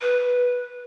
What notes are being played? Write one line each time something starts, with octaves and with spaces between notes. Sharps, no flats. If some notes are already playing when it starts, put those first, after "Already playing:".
B4